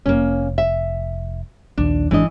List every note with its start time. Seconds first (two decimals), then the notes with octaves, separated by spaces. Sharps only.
0.06 F1 A#3 C#4
0.58 E5
1.77 A#1 D#2 D4
2.11 G#1 E3 G#3 D4 D#5